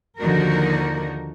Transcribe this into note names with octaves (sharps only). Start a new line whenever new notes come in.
D#2 D3 F3 D#4 F#4 A#4